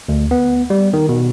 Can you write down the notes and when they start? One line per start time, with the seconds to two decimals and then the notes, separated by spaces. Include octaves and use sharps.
0.09 D2
0.31 B3
0.70 G3
0.93 D#3
1.09 B2